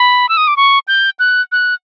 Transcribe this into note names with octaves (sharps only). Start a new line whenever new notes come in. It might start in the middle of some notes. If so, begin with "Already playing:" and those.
Already playing: B5
E6
D#6
D6
C#6
G6
F#6
F#6